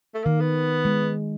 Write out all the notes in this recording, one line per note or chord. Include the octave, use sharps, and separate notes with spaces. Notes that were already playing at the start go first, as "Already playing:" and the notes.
A3
D#3 A#3
B3
G#3